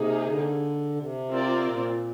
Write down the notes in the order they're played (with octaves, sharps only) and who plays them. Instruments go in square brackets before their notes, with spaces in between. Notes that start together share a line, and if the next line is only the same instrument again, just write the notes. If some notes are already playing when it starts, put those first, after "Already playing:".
Already playing: [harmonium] C3 [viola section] A#3 D#4 G#4
[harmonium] D3
C3
[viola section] C4 F4 A#4 D5
[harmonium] A#2